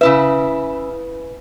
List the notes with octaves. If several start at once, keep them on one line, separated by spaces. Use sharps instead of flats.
C#3 E4 B4 E5